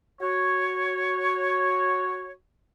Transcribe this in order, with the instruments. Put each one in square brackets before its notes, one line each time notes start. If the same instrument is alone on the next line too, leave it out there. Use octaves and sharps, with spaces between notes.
[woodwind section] F#4 C#5